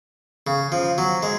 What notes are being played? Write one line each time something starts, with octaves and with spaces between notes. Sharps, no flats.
C#3
F3
F#3
G#3